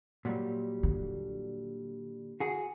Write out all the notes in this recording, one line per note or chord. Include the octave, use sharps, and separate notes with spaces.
A#2 F#3 G3
D3
F#4 G#4